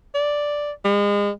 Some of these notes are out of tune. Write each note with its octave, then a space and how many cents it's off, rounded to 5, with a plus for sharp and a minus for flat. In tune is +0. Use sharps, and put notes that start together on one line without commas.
D5 +0
G#3 -35